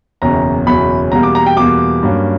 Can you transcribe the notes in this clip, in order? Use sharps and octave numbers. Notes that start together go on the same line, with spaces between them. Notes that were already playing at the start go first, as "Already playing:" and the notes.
F#1 E2 B2 F#3 C#4 A#5
F#1 E2 B2 F#3 C#4 B5
E2 B2 G3 A#3 A#5
D6
A#5
G5
E2 B2 G3 A#3 D6
G2 F#3 A#3 C#4